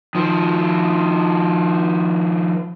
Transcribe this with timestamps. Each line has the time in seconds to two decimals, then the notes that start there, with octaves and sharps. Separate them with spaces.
0.15 D#3 F3